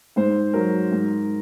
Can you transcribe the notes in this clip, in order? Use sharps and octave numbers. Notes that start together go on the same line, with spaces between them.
G#2 C5
F#3 A#4
G#2